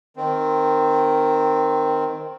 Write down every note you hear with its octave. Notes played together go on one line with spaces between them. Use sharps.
D#3 C4